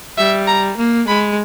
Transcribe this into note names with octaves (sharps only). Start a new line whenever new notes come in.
G3 E5
A#5
A#3
G#3 B5